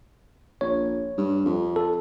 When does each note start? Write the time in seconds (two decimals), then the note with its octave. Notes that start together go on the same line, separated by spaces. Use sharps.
0.61 A#1 C#5
1.17 G2
1.46 F2
1.76 A4